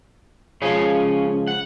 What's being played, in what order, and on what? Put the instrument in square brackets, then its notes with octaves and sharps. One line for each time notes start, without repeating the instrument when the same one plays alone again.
[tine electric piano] C#3 F3 G#3 [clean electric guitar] C#4 F5 G#5
[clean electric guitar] F#5